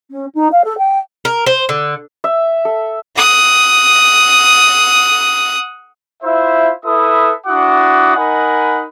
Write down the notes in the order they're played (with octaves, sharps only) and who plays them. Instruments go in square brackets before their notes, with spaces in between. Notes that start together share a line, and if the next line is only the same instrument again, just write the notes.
[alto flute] C#4
D#4
F5
A4
G5
[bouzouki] A#4
C5
D3
[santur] E5
A4
[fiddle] F#5 D#6
[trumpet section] E4 F4 C5 E5
E4 A4 B4 E5 D#6
D4 E4 F#4 F#5 D6 D#6
D#4 A#4 D#5 F#5 G#5 B5